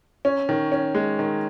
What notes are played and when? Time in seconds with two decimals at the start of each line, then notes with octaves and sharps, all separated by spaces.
0.25 C#4
0.49 D#3
0.72 C#4
0.95 G#3
1.19 D#3